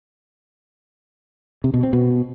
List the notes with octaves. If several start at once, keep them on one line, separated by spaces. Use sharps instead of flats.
C3
B2
C4
B2